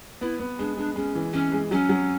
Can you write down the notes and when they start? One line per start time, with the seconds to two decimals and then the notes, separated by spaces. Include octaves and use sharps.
0.21 B3 E4
0.40 B3
0.59 G#3 D4
0.77 G#3 D4
0.96 G#3 C#4
1.15 E3
1.33 E3 C#4
1.52 G#3
1.71 F#3 C#4
1.89 F#3